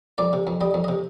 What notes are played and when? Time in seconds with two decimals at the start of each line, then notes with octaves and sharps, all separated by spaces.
0.18 F2 D5
0.33 C3
0.47 F2
0.61 G3 D#5
0.74 F2
0.84 C3 D#5